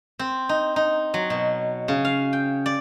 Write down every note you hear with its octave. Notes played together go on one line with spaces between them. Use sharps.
C4
D#4
D#4
F#3
B2
C#3
F5
G5
D5